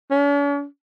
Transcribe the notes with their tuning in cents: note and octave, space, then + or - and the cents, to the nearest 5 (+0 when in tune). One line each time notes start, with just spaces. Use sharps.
C#4 +45